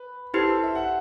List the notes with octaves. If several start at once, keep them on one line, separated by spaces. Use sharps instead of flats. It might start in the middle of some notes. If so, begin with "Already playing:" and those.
Already playing: B4
E4 G4 A4 B4 C5
E5
F#5